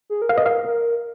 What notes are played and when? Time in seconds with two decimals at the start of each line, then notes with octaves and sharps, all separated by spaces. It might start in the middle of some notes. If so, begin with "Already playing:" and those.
0.10 G#4
0.22 A#4
0.29 F5
0.36 B4 D#5
0.43 A#4 F5
0.65 A#4